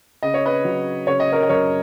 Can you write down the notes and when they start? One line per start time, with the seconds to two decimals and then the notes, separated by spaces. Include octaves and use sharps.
0.23 C#3 D#5
0.34 C#5
0.46 B4 D#5
0.64 F#3
1.07 C#3 C#5
1.20 D#5
1.32 A#4 C#5
1.43 D#5
1.49 F#2 A#4 C#5